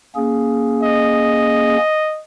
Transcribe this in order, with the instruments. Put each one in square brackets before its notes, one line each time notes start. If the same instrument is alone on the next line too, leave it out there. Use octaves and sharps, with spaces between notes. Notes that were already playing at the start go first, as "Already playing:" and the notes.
[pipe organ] A#3 C#4 G#4
[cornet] D#5